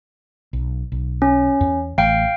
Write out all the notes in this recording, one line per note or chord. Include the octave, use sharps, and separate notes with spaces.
B1
B1
C#4
E2
A1 E3 A3 F5 G5